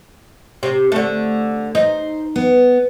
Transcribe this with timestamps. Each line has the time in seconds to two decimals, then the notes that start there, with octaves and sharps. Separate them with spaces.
0.63 C3
0.92 D3 A3
1.75 D#4 C5
2.36 B3